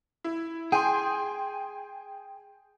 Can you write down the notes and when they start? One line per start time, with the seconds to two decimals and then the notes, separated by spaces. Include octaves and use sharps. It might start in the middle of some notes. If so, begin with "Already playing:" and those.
0.24 E4
0.72 G#4 G5 G#5 C6